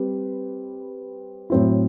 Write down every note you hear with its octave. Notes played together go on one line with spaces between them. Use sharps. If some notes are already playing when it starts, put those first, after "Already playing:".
Already playing: G3 C4 G4 B4
A2 F#3 C4 E4